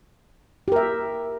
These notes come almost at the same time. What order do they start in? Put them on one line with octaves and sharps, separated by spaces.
G4 A#4 E5